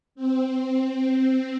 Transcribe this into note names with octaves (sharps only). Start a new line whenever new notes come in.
C4